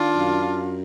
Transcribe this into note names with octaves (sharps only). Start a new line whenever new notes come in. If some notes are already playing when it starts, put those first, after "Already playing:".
Already playing: D#3 D4 F4
F#2